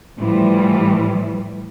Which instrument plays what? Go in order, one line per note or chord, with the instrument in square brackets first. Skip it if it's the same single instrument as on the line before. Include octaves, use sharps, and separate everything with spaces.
[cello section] A2 E3 F3 G3